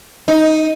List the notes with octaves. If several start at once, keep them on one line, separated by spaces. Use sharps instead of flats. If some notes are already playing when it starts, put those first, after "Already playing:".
D#4